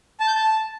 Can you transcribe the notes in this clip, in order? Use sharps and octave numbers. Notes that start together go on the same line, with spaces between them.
A5
G6
A5